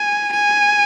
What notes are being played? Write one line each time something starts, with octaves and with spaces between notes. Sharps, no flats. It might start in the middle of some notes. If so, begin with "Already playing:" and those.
Already playing: G#5
G#5